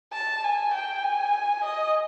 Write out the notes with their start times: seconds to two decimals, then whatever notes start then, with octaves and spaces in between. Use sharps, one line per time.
0.13 A5
0.44 G#5
0.74 G5
1.04 G#5
1.64 D#5